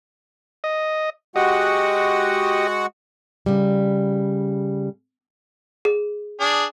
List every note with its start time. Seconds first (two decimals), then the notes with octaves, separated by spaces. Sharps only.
0.64 D#5
1.36 G#3 F#4 G4 D#5 F#5
3.46 C#3 G3
5.85 G#4
6.40 D4 G#4